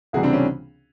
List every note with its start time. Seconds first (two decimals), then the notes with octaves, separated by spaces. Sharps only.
0.13 C#2 C3 E3 G3 F#4 G#4
0.23 C4 D4
0.33 C#4